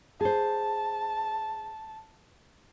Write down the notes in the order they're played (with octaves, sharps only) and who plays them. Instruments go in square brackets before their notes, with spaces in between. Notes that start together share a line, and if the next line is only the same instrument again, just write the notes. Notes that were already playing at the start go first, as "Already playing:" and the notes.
[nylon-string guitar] G#4 C5 [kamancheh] A5